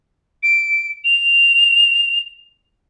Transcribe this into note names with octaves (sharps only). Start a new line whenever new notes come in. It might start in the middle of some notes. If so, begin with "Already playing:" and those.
D7
F7